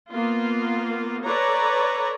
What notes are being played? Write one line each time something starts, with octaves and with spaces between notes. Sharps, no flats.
A#3 B3 F4
A4 B4 C#5 D5 A#5